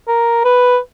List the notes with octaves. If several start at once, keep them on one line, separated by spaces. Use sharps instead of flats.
A#4
B4